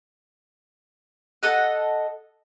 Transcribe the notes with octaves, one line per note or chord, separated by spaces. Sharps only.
A4 D#5 F#5